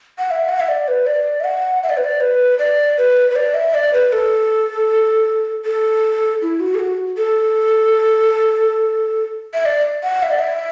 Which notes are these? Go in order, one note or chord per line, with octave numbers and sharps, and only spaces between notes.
F#5
E5
F#5
E5
D5
B4
D5
E5
F#5
E5
D5
B4
D5
B4
D5
B4
B4
D5
E5
D5
B4
A4
A4
E4
F#4
A4
F#4
A4
E5
D5
F#5
E5
D5
E5